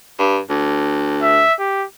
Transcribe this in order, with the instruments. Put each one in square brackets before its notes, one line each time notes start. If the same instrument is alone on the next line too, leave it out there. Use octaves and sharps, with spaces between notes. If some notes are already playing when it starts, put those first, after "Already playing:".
[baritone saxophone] G2
D2
[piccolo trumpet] E5
G4